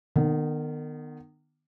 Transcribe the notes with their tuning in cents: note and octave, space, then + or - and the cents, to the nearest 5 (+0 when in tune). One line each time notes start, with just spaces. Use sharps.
D#3 -35 B3 +0